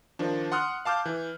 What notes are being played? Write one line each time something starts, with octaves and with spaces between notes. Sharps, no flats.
D#3 F3 D4
F#5 C6 D#6 F6 F#6
F5 A5 D6 F6 G6
E3